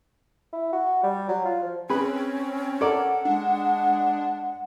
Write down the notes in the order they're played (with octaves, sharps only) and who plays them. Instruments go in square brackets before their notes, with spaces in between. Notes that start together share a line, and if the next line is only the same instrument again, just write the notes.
[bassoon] E4
F#4
G3
F#3
F4
F3
[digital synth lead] C4 [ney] C#4 [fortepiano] G#4 B4
[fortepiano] A4 A#4 D5 [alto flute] F#5
[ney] G#3 [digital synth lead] D4